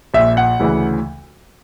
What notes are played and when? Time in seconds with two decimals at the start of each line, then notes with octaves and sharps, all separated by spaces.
0.14 A#1 A#2 E5
0.37 F#5
0.59 D2 C#3 E3